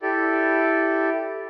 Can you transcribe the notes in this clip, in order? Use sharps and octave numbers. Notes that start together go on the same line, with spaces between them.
E4 G4 A4 D5